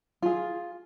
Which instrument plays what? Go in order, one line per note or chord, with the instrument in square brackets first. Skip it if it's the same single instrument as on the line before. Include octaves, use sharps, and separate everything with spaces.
[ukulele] F4 G#4